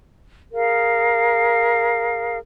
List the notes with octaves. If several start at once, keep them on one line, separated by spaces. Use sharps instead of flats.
G#4 A#4 F5